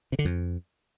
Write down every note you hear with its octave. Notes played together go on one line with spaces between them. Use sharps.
C3
D3
F2